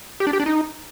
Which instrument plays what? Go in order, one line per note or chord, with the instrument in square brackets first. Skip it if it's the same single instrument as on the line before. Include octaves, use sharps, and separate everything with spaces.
[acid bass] G4
D4
G4
D4
D#4